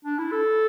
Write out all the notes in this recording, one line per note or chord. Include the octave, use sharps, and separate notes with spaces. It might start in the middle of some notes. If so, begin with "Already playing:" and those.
D4
E4
A4